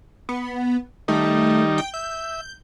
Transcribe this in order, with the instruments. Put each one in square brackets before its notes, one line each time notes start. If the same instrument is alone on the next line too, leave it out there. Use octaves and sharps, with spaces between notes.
[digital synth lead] B3
[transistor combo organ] D#3 G3 D#4 [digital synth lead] A3
[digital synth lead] G5
[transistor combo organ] E5 [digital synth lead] G6